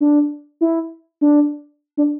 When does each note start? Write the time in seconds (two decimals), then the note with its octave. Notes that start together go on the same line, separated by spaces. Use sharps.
0.01 D4
0.61 E4
1.21 D4
1.97 D4